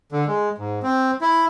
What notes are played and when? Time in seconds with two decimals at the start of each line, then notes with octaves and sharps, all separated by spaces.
0.12 D3
0.27 G#3
0.58 G#2
0.83 C4
1.21 E4